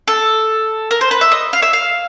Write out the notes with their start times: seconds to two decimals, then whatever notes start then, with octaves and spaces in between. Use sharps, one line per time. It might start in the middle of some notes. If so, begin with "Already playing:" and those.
0.08 A4
0.91 A#4
1.01 C5
1.11 B4
1.21 E5
1.32 D#5
1.53 F5
1.62 E5
1.73 F5